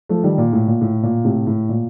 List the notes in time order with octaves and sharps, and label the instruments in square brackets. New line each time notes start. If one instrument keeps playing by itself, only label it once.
[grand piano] F3 A3
D#3 G3
A#2
A2
A#2
A2
A#2
A2 C3
A2
A#2